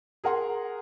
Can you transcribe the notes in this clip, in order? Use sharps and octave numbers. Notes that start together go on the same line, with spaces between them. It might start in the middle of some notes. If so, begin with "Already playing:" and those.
G#4 A#4 F#5 C6